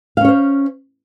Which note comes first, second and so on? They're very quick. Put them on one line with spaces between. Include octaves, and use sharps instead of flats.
F5 C#4 C#5 C5